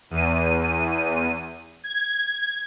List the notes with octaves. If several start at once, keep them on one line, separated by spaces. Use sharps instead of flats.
E2 D#7
G#6